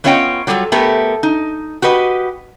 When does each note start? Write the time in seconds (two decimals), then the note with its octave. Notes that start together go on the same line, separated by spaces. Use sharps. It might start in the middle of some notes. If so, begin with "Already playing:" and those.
0.04 B3 C#4 F4 C#5 D#5 G5
0.47 F#3 G3 F4 G#4 A4
0.72 A3 B3 G4 A4 A#4
1.23 D#4
1.82 F#4 G4 B4 D#5